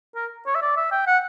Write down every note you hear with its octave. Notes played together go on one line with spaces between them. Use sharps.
A#4
C#5
E5
D5
E5
G5
F#5